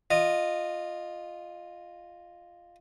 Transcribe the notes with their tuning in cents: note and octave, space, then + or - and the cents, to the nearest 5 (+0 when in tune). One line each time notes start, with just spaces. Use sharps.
F4 +0 D#5 -15